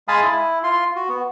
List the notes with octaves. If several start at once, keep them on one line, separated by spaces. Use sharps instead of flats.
G#3 F5 G#5 A5 B5 D#6
E4
F4 C6
F#4
B3